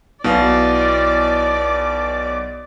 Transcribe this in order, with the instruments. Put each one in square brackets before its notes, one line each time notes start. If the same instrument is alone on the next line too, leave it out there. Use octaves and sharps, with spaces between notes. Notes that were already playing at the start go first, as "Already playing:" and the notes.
[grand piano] B1 F5 [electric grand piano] B2 [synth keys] E4 [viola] D5